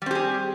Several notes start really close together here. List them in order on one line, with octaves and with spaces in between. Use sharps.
G3 C4 G4 G#4